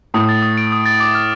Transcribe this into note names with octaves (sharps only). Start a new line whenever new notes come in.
A2 D#6
A6
D#6
D7
D#6
A6
D6
F6